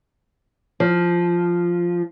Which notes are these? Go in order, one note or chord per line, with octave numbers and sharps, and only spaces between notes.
F3